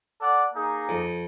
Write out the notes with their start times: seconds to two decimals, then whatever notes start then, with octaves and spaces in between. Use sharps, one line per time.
0.20 A4 D5 F#5
0.53 A#3 D#4 G#4
0.89 F2